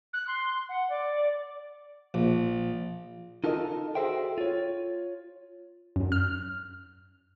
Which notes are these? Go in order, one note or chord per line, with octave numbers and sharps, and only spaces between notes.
F#6
C6
F#5
D5
A#1
D#4 F4 A4 A#4 C#5 D#5
F#4 G#4 A4 C5 E5 G5
F4 C#5
F#2
F6